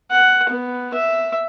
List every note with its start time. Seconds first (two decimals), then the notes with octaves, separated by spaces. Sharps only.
0.11 F#5
0.49 B3
0.94 E5